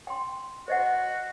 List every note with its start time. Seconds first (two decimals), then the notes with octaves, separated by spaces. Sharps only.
0.07 G5 C6
0.68 F#4 C5 D#5 F#5